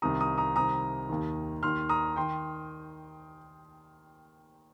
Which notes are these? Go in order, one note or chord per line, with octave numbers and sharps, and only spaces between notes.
C2 C3 D#3 A#5 D#6
A#5 D#6
A#5 D#6
C2 C3 D#3 A#5 D#6
D#2 D#3
D#2 D#3 C6 F6
A#5 D#6
D#3 G5 C6